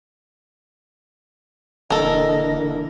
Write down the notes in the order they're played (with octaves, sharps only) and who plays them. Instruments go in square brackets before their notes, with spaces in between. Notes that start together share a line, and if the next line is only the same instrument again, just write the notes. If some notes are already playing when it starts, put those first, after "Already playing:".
[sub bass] D#1 [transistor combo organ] D3 E3 A#3 [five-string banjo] A4 A#4 [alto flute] D#5